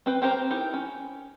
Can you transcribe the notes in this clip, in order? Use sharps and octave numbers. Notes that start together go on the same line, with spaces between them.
C4 B4 G5
C4 G4 A#4 C5 A#5
D#4 E4 G4 A#4
C#4